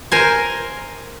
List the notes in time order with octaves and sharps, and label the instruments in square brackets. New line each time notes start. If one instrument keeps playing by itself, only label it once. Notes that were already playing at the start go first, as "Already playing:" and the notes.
[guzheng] A#4 C5 G#5